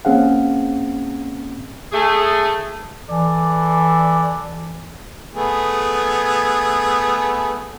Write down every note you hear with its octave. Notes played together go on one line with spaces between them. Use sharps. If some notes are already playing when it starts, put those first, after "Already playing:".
A#3 C4 C#4 G#4 F5 F#5
A3 G#4
E3 A4 D5
A3 B3 G#4